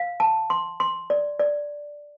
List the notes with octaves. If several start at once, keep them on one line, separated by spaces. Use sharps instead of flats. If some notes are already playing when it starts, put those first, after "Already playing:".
Already playing: F5
A5
C6
C6
D5
D5